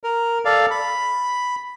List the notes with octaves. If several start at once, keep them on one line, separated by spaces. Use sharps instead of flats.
A#4
A4 D5 F5
B5